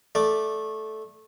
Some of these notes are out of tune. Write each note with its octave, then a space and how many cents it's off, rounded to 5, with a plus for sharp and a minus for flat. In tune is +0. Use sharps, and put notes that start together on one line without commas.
A3 -10 D5 +0